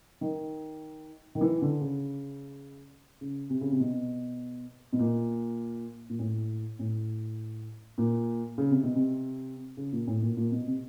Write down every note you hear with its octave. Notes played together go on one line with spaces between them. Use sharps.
D#3
D#3
E3
D3
C#3
C#3
C3
C#3
C3
B2
B2
A#2
A#2
A2
A2
A#2
C#3
C3
B2
C3
C#3
A#2
A2
A#2
A#2
B2
C3